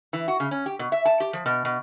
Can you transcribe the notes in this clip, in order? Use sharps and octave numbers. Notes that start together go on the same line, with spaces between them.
E3
F#4
C#3
C#4
G4
B2
E5
A5
G4
F3
B2
B2